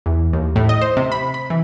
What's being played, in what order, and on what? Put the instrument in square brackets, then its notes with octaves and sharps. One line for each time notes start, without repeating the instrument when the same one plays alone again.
[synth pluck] E2
D#2
A2
D#5
C5
C3
B5
B5
E3